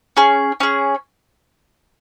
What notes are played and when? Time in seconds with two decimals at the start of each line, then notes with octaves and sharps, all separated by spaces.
0.17 C#4 G#4
0.60 C#4 G#4